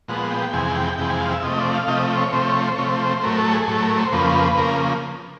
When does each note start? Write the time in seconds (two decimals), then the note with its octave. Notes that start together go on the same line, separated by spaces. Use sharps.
0.08 A#2 F3 G#3 B3 F#5
0.30 G5
0.53 F2 C3 E3 G#3 G#5
0.76 G5
0.98 F2 C3 E3 G#3 G5
1.10 G#5
1.20 F5
1.31 E5
1.42 C3 F3 A3 D#5
1.59 D5
1.74 F5
1.88 C3 F3 A3 D#5
2.18 C#5
2.32 C3 F3 A3 C5
2.47 C#5
2.61 C5
2.74 C3 F3 A3 C#5
2.89 C5
3.22 A2 F#3 A3 A#4
3.38 A4
3.52 G#4
3.68 A2 F#3 A3 A4
3.82 A#4
3.97 C5
4.12 F2 C#3 F3 A#3 B4
4.57 C#3 F3 A#3 A#4